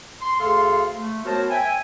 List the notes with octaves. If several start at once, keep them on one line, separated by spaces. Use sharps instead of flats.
C6
D2 C#3 A4 F5 C6
A3
B3 F#4 A#4 C5 C#5 A5
E5 G5 G#5